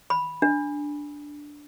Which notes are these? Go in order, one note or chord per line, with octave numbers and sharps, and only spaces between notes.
B5
D4